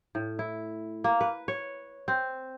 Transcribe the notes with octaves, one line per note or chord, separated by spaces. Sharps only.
A2
E4
A#3
B4
C#5
C4